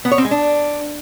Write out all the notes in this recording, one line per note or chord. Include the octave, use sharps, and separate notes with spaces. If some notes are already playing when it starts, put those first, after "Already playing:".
B3
C#5
C4
G#3
D4